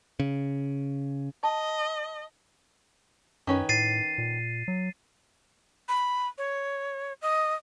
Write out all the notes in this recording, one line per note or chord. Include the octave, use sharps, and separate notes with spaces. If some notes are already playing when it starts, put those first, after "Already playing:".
C#3
D#5 A5
F#2 D#3 C#4 B4
A2 A6 C7 D#7
A#2
F#3
B5
C#5
D#5